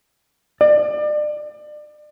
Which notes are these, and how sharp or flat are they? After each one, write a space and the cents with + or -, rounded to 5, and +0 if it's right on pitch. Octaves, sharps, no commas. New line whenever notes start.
D5 +35